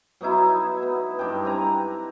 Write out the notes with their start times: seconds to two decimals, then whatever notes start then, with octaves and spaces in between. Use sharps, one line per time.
0.21 F#3 B3 D#4 E4
0.83 B3
1.19 G2 D4 G5
1.45 C4 G#5 A#5